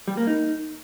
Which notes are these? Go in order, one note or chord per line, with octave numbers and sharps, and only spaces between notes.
G3
A#3
D#4